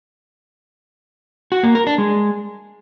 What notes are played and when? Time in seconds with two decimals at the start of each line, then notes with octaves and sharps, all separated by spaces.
1.52 F#4
1.63 A#3
1.75 A#4
1.87 D4
1.98 G#3